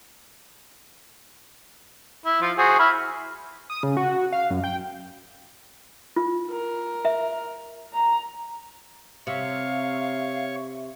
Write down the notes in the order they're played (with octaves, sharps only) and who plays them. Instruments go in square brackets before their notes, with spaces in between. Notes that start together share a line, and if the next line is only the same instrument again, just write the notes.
[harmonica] E4
F3 F4
F#4 G#4 C5
E4 B5 F6
[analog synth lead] D#6
C#3
F#4
F5
F#2
G5
[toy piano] F4
[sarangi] A#4
[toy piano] E5
[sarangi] A#5
[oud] C3 [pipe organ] C#5 C#6 [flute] E5 [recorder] F5